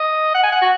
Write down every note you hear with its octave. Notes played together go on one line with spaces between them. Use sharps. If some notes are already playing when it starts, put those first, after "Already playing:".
Already playing: D#5
F#5
G#5
F#5
F#4